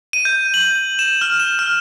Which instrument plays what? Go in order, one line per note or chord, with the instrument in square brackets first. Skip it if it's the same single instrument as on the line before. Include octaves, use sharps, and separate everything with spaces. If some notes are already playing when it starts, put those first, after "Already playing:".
[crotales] D#7
G6
F#7
E7
F6
E7
F6